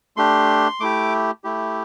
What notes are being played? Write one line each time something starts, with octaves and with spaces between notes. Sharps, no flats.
A3 D4 G4 C6
A3 E4 G4 D6
A3 E4 G4